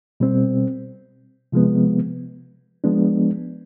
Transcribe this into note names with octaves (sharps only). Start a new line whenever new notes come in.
B2 G3 C4
C3 F3 G#3 B3
F3 G#3 B3 D4